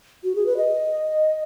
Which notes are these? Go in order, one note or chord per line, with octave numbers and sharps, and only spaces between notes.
F#4
G#4
B4
D#5